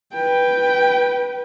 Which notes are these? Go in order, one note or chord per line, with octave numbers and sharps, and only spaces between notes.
B4 G5